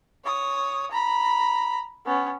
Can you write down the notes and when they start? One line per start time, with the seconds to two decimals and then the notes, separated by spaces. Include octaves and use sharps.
0.24 C#5 D#6
0.91 A#5 B5
2.06 B3 C#4